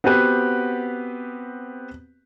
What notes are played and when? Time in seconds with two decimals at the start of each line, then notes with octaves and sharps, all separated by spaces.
0.04 B3 C4 F#4 G4 B4